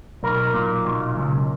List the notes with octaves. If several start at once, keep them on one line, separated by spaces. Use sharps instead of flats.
B1 A#4
A#2
B1
C#2